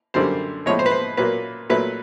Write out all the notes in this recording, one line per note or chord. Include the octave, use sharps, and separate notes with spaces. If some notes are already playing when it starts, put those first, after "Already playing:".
F#2 D3 G3 A#3 C5
A2 F3 G#3 C#5
C5
B4
C5
A#2 F#3 A#3 B4
A#2 F#3 A3 B4